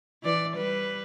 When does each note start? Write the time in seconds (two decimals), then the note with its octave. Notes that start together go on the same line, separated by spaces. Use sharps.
0.23 E3 D5
0.56 G3 B4